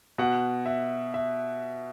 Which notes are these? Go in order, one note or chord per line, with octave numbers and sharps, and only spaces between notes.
B2 F#5
E5
E5